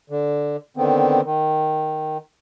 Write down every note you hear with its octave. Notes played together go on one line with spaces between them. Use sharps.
D3
D3 D#3 B3 C4
D#3